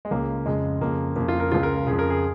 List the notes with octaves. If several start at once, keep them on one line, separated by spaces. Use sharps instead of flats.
G#3
C#2 C#3 A#3
F2 C#3 G#3
F2 C#3 A#3
F2 C#3 A#3
F4
A#4
C#2 C#3 F4
A#4
F2 C#3 G#4
A#4
G#4